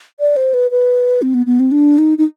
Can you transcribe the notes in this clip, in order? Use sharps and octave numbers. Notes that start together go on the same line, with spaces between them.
D5
C5
B4
B4
C4
B3
B3
C4
D4
D#4
D#4